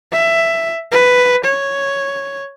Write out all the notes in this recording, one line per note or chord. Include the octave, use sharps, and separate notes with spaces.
E5
B4
C#5